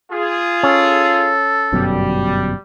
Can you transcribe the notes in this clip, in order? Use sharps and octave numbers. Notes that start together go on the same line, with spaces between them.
F4 G#4
C#4 A4
G1 F#2 B2 G3